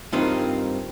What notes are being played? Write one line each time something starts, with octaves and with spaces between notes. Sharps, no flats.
G2 D#3 C4 D#4 F4